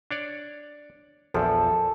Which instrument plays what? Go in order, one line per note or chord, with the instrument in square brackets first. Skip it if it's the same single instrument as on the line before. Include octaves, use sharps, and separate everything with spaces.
[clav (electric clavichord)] D4 C#5 D5
[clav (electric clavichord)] A#1 E2 F3 [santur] A4 D5